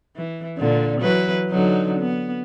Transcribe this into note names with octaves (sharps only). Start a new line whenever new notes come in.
E3
A#2 D3
E3 F#3 B4
D3 F#3 D#4
B3